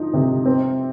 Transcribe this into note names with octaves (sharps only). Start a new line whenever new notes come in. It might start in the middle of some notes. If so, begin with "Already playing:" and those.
Already playing: F3 D#4
C3
C4